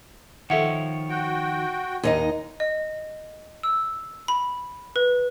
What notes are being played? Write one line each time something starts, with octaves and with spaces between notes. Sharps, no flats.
D#3 F3 A4 C#5 E5 F#5
F#4 G5
D#2 D#4 D#5
D#5
E6
B5
B4